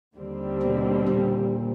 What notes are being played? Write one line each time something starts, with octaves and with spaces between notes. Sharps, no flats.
D#2 D3 G3 C4
B2
A#2